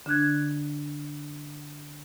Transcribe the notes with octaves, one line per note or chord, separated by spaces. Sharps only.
D3 D4 F#6 G#6